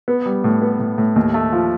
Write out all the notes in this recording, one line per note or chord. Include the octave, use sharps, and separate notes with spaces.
B3
G3
A2
B3
A2
A2
D#2
A3
F3